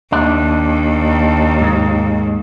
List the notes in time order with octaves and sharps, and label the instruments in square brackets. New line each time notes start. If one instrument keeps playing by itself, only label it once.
[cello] D#2 [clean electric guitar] D4
[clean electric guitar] G#2